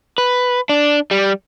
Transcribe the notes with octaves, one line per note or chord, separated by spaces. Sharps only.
B4
D4
G3